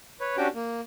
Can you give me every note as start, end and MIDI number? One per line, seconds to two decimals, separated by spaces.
0.20 0.37 71
0.20 0.37 73
0.38 0.48 61
0.38 0.48 62
0.38 0.48 66
0.38 0.48 67
0.38 0.48 79
0.55 0.81 58